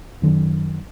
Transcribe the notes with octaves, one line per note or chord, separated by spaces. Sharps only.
F#2 D#3